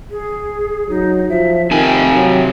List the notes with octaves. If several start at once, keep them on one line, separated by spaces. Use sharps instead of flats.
G#4
F#3 D#4
F3 E5
C3 D#3 G5 G#5
F#3